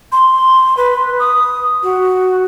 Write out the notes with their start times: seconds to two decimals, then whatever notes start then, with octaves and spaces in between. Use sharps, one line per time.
0.12 C6
0.77 B4
1.19 D#6
1.83 F#4